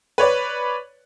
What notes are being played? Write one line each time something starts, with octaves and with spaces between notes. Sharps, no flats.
B4 C#5 D5